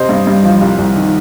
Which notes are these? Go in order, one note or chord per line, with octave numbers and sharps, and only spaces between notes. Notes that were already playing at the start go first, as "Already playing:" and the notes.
Already playing: C3 C5 D#5
G2
G2
F3
C2
C2
D#3